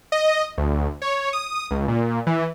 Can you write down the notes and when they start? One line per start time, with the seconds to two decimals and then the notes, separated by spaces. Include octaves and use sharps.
0.12 D#5
0.58 D2
1.02 C#5
1.33 D#6
1.71 C#2
1.88 A#2
2.27 E3